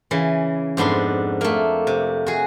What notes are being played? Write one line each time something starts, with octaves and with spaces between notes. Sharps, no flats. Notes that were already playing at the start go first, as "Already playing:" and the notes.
C#3 E3
F2 G#2 B3 D4 C6
A3 A#3
C3
F#4 G#4